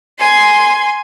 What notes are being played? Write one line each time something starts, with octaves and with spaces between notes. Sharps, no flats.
G#5 C6